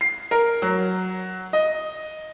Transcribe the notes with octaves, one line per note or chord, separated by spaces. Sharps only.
C7
A#4
F#3
D#5